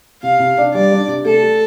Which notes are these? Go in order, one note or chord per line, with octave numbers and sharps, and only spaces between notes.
C3 F5
C3
D4
G3 D5
D4
C3
A3 A4
A3